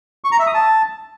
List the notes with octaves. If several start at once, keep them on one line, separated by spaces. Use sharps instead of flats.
C#6
A#5
E5
D#6
A5